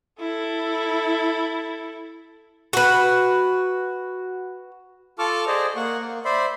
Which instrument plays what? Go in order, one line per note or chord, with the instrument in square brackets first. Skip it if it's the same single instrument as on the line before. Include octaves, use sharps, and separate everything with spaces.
[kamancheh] E4 A4
[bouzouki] F#4 B4
[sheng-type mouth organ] F4 A4 A5 C#6 D6 F6
G#4 C5 D5 D#5
A#3 F#5 C#6
A#3
C5 D5 E5 B5 C6